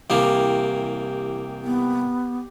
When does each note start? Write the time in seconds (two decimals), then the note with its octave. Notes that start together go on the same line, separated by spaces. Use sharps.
0.10 C2 E3 A#3 G4
1.64 B3